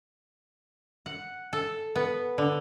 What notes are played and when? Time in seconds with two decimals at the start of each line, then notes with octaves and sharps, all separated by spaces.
1.06 F#5
1.53 A4
1.96 B3
2.38 D3